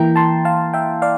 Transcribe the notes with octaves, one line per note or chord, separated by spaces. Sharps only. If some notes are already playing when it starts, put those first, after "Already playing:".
Already playing: E3 A#3 E4 G5 A#5
A5 C6
F5 A5
E5 G5
D5 F5